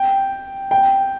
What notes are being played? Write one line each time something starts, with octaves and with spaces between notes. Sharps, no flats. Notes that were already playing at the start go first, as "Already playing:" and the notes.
Already playing: G5
G5